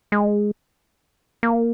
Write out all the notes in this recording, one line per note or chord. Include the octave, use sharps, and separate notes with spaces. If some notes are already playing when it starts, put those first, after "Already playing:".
G#3
A#3